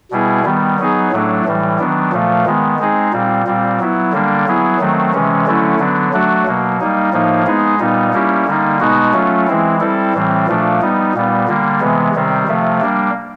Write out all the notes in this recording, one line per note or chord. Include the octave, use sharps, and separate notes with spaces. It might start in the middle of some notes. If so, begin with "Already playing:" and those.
B2 G3 B3 E4 G#4
D#3 G3 B3
F#3 B3 D#4 G#4
A2 F#3 A3 D4
A2 E3 G3
D#3 F#3 B3 D4
A#2 F3 A3
D#3 G#3 B3
G#3 C4 D#4 G#4
A#2 G3 C4
A#2 G3 C4
F#3 B3 E4
D3 G3 A#3 D4
F#3 B3 E4 G#4
D#3 F#3 A3 C4
C3 E3 G#3 C#4
D3 F#3 A3 C#4 E4
D3 F#3 B3 D4
F#3 A3 D4 F#4
B2 F#3 A#3
G3 A#3 D#4
A2 F3 A#3 D#4
G#3 B3 D#4 G#4
A#2 G3 B3 D#4
G3 A#3 C#4 E4 G4
D3 G3 A#3 D#4
B2 G#3 B3 D#4 F#4
F#3 A3 C#4 F4
E3 G#3 C4 E4
G3 C4 E4 A4
A2 E3 G3 C4
A#2 F3 A3 D4
G3 B3 D#4
A#2 G3 B3
D3 G3 A#3
C3 E3 G#3 B3
C3 D#3 G3 C4
C3 F3 A3
G3 A#3 D4